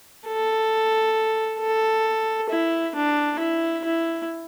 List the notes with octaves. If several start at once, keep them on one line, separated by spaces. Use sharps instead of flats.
A4
A4
E4
D4
E4
E4